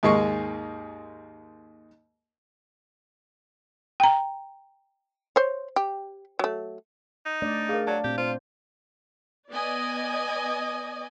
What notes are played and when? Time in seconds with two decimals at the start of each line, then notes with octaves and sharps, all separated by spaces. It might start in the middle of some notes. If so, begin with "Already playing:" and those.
0.03 D#2 G#2 G#3 A#3 C#6
4.00 G5 A#5
5.36 C5 C#5
5.76 G4
6.39 F#3 A3
7.26 D#4
7.42 A3 D4 D5
7.69 G#4 A#4 F5
7.87 F#3 D5 A5
8.04 A#2 C4 G4
8.18 F4 C5
9.51 B3 D5 D#5 G#5